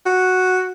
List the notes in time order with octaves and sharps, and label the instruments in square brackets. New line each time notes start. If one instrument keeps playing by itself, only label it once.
[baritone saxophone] F#4